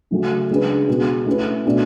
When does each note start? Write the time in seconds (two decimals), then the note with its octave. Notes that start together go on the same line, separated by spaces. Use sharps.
0.11 C#3 F#3 A3 C#4 F#4
0.50 C#3 G#3 D4 G#4 B4
0.88 B2 G#3 B3 F#4
1.26 A3 C#4 E4 B4
1.66 B2 A3 D4 F#4